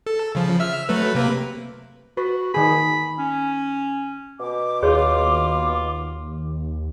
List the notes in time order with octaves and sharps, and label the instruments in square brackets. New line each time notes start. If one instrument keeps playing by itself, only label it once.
[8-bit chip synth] A4
C#3 F3
E5 E6 F6
F#3 A3 B4
C3 A#3 B4
[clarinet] F#4 [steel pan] B4
[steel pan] D#3 G#4 [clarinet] B5
[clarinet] C#4
[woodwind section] B2 D6
[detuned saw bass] D#2 [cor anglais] F4 [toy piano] G#4 C#5